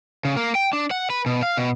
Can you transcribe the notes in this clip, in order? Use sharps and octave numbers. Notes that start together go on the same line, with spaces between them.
C#3
A#3
G5
D4
F#5
B4
B2
F5
B2